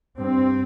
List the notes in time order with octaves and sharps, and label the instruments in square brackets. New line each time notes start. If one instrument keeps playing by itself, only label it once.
[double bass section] G2 C4